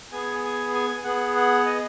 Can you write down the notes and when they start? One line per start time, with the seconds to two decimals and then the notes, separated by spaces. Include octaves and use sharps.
0.12 B3 G#4 G#5
0.44 G#5
0.74 G#5
1.04 B3 G#4 F#5
1.36 F#5
1.66 D#5